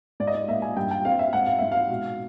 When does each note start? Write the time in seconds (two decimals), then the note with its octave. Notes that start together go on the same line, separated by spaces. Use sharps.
0.20 G#2 D5
0.27 D#5
0.34 D5
0.48 A#3 E5
0.62 G#5
0.77 G2 G5
0.91 G5
1.05 C4 F5
1.19 E5
1.33 G#2 F#5
1.46 F5
1.59 G#2 E5
1.72 F5
1.90 B2